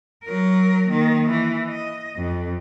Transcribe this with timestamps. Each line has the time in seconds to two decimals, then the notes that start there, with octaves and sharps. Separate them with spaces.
0.25 F#3 A#4
0.88 D#3 A#3
1.29 E3
1.69 D#5
2.17 F2